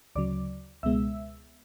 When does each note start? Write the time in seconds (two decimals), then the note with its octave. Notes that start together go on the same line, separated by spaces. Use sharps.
0.15 D2 C#3 F#3 D5 D6
0.83 C#2 B2 G#3 B3 E5 E6